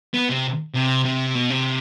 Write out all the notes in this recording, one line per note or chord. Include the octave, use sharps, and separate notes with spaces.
B3
C3
C3
C3
B2
C3